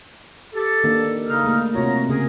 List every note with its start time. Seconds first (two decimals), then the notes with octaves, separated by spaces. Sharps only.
0.55 G4 A4
0.84 D#3 A#3 D4
1.28 C#3 D#4 F6
1.44 A3 A#3
1.75 C3 F4 F#4 C#5 A#5
2.09 C#3 C#4 G#4 A#4